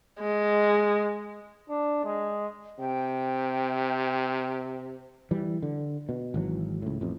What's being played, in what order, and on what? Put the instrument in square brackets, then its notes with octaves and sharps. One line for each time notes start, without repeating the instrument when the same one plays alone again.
[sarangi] G#3
[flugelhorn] D4
G#3
[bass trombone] C3 [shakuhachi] G5
[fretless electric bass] E3 G3
D3
B2
G#1 E3 F#3
C#2 A2
A1 F2